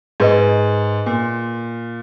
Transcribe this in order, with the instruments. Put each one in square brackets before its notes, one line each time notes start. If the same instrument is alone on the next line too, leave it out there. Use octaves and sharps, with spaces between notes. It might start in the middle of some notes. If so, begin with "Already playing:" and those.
[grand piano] G#2 [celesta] G#4 B4 D#5
[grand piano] A#2